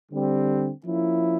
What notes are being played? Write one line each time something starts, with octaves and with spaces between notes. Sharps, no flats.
D3 G3 C4
F3 A#3 C#4 E4